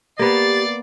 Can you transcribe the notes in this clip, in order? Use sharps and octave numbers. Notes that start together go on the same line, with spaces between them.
A#3 B3 G4 D5 A6 C7